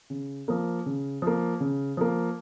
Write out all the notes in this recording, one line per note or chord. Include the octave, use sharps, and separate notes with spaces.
C#3
F3 A#3
C#3
F3 A#3
C#3
F3 A#3